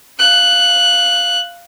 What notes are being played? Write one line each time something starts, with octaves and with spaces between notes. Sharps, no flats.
F5 F#6